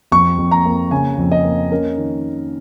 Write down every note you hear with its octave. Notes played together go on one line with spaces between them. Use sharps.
F2 C#6
F2
A#5
A#3
C#3 G#5
F2
D#5
A#3
C#4 A#4
D#3